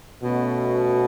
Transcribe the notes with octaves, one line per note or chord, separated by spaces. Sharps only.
B2 A3 C#4 F#4